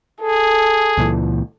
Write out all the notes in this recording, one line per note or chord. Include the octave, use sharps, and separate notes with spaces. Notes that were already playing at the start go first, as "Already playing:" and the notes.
G#4 A4
C#2 A#2 E3